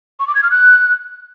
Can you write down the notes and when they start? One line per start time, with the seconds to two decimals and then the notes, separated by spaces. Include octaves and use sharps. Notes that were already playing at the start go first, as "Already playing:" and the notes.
0.20 C#6
0.27 D6
0.35 G#6
0.43 F6
0.51 F#6